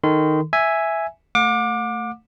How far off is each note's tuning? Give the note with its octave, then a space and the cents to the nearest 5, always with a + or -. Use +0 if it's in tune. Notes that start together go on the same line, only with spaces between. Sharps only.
D#3 +0 A4 +0 C6 -35
E5 +0 G#5 +0
A3 +15 F#5 -45 D6 +15